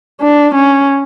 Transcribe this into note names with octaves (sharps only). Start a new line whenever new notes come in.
D4
C#4